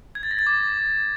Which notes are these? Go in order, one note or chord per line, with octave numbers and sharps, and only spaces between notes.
G#6
A6
A#6
A6
D6